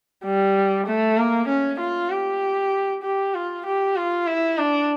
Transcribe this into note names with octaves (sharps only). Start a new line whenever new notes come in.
G3
A3
A#3
C#4
F4
G4
G4
F4
G4
F4
E4
D4